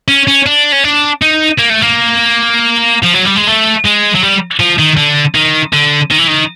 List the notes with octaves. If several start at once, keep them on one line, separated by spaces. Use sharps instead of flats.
C#4
C#4
D4
C#4
D4
D#4
A#3
A3
A#3
F3
F#3
G3
G#3
A3
G#3
F#3
G3
F3
D#3
D3
D#3
D3
D#3
E3
D#3